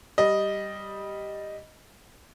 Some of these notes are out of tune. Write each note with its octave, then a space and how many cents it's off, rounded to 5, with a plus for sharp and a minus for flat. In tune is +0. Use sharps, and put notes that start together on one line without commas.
G3 +0 D#5 +0